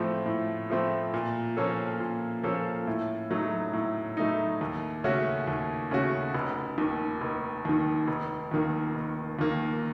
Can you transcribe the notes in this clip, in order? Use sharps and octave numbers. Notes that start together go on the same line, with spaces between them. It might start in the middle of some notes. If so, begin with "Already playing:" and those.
Already playing: A2 F3 A3 C4
A2
F3 A3 C4
A#2
F3 A#3 C#4 A4
A#2
F3 A#3 C#4 A4
A2
F#3 A3 D#4
A2
F#3 A3 D#4
D#2
C#3 A3 C#4 F#4
D#2
C#3 A3 C#4 F#4
F1
D#2 D#3
F1
D#2 D#3
F1
D#2 D#3 A#3
F1
D#2 D#3 A#3